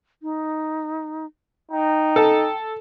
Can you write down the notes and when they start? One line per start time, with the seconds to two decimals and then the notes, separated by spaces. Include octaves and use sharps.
0.23 D#4
1.71 D#4 G5
2.16 A4